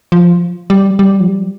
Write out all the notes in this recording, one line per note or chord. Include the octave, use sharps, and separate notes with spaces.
F3
G3
G3
F3
G3